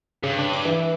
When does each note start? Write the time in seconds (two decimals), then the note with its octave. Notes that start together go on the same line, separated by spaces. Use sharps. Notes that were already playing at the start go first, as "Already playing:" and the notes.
0.23 G2 C#3
0.39 D4
0.53 D6
0.65 E3
0.80 E3